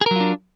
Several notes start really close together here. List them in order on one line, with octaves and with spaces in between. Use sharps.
G#4 A#4 F#3 F4 D4